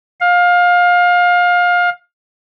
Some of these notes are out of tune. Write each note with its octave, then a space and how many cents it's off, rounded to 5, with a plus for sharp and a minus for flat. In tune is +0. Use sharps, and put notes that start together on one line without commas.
F5 +25